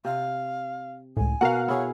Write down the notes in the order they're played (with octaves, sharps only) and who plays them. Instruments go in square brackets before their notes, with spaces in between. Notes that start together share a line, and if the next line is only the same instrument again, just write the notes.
[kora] C3 [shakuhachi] F5
[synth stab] C#2 A2 [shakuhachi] G#5
[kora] B2 A#4 [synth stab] F5 F#5
[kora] E4 G#4 [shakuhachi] C#5